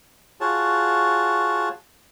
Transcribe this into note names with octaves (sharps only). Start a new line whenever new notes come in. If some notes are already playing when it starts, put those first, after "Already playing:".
F4 F#4 G#4 C#5 A5